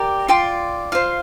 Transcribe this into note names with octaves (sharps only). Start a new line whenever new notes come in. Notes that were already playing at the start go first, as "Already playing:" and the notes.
Already playing: G4 A#4 D5
F4 D5 G5 C6
F4 C5 F5